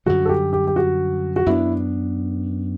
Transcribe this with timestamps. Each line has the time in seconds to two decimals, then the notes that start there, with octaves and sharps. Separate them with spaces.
0.06 F#2 D3 G3 F#4
0.25 A4
0.29 G4
0.53 G4
0.67 G4
0.76 F#4
1.36 F#4
1.46 F#2 F#3 B3 D4 E4